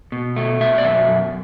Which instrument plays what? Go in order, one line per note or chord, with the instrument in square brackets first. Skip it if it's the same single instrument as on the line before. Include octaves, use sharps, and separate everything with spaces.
[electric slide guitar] B2
A3
B2 E5
D5
F#2 E5
F#2